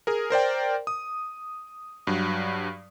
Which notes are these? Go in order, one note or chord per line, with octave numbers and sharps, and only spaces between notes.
G#4 A#4
A#4 C5 D5 G5
D#6
G2 F#3